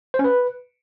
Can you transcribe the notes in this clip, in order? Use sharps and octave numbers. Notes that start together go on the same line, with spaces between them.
C5
C#4
B4